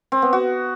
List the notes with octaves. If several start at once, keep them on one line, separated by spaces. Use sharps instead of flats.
C4
B3
F#4